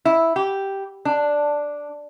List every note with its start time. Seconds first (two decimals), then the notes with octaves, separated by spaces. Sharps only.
0.05 E4
0.36 G4
1.05 D4